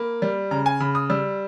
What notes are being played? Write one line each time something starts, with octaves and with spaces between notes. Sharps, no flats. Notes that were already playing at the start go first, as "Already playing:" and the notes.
Already playing: A#3 B5
G3
C#3 A#5
G#5
C#3 B5
D#6
G3 E6